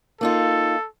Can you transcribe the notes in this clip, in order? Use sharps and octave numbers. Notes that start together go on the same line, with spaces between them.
A#3 D#4 F4 A4